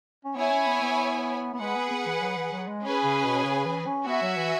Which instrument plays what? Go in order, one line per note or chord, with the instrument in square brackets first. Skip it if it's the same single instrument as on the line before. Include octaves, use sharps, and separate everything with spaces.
[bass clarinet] C#4
[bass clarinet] B3 [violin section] E4 C#5 G#5
[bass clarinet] C#4
B3
B3
B3
[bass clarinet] G#3 [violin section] G#4 B4 F#5
[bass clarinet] B3
B3
E3
F#3
E3
F#3
G#3
[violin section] C#4 G#4 B4 G#5
[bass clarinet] C#3
B2
C#3
E3
C#4
[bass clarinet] B3 [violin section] F#4 E5 G#5
[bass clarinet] F#3
E3